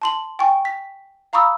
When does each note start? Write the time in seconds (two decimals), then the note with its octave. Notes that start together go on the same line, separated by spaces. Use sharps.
0.02 A5 C6 F#7
0.39 G5 G#5 C#6
0.65 B6
1.33 F5 A#5 B5 C#6 D#6 E6